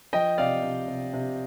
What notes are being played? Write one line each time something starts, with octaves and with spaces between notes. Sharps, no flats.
F3 D#5 G5
C3 D5 F5
C3
C3
C3